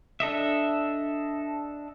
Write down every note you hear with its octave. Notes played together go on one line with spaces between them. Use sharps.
D4 A4 D#5 E5